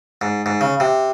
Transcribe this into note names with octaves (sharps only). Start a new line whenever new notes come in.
G#2
G#2
C#3
C3